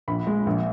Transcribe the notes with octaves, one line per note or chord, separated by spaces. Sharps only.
A#1 B5
G#3
A#1